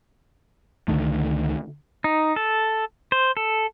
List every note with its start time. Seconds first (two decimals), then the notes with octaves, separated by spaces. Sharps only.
0.88 C#2 D3 D#3 A3
2.04 D#4
2.36 A4
3.12 C5
3.37 A4